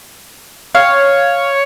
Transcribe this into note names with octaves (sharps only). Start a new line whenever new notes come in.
C#5 F5